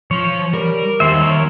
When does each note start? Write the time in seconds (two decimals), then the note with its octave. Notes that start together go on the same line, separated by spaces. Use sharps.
0.11 F3 C#5 C6
0.54 G3 A#4
1.00 D#2 G3 C5 E5
1.21 A#4 C#5 E5